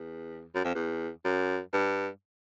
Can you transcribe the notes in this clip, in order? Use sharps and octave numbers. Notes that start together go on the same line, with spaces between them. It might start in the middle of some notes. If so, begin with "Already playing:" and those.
Already playing: E2
F#2
F2
E2
F#2
G2